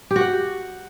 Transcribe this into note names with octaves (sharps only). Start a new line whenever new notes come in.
G4
F#4
F#5